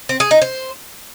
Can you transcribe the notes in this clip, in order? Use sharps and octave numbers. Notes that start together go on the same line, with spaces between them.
C4
G#4
D#4
C5